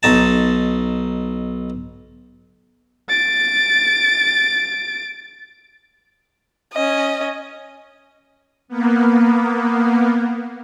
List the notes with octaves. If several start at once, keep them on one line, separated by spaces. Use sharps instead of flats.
B1 D#4 A5
A6 D7
C#4 D#5
A#3 B3